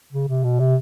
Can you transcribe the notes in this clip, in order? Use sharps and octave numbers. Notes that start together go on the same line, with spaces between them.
C#3
C3
B2
C3